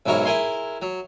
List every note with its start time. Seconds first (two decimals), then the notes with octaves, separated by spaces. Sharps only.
0.06 B1 G#2 F#3 E4 A#4 C#5
0.25 E4 G#4 A#4 G#5 C6
0.82 F#3